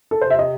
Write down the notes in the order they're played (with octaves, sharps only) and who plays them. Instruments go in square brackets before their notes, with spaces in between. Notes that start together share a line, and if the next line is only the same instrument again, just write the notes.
[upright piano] A4
[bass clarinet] C3 [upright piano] C5
[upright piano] E5
D#5